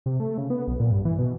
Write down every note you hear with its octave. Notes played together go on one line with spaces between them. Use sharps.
C3
A3
C#3
B3
B1
A#2
G2
E3
B2